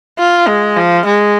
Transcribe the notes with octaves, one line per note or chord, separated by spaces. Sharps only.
F4
G#3
F3
G#3